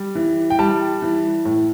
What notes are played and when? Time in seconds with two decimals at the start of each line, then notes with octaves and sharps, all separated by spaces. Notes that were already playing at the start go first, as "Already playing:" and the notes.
Already playing: G3
0.15 E3
0.50 G5
0.59 G3 A5
1.02 E3
1.45 A2